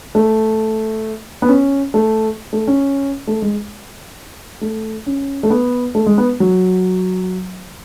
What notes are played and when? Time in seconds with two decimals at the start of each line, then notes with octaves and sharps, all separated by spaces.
0.15 A3
1.42 B3
1.49 C#4
1.94 A3
2.53 A3
2.67 C#4
3.27 A3
3.42 G#3
4.61 A3
5.06 C#4
5.43 A3
5.50 B3
5.95 A3
6.06 G#3
6.18 B3
6.40 F#3